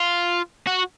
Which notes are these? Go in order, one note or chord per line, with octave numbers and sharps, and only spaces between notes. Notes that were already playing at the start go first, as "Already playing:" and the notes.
Already playing: F4
F#4